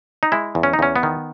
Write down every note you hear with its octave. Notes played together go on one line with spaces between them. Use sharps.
D#4
G#3 E4
E2
C#4
D#4
E2 C#4
B3
D#3